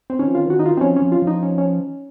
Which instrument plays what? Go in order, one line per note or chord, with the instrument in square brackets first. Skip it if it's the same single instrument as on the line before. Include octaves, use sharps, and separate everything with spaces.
[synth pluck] C4
[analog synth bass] D#3 [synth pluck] C#4
[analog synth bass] F3
[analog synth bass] D#3 [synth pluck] F4
[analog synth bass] F3
[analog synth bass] D#3 [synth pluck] F#4
[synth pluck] D#4
F4
C4
[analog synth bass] F3 [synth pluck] C#4
[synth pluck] C#4
[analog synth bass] F3
[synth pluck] F4
[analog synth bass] F3
[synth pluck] D#4
C#4
C#4